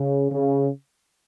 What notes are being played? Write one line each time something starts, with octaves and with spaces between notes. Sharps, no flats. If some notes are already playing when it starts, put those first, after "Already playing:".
Already playing: C#3
C#3